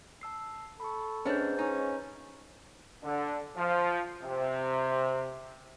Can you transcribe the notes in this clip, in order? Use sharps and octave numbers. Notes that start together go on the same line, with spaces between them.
A5 E6 C7
A4 B5 C#6
G#2 C#4 D4 B4 G6
C#4 D#4
D3
F3
C3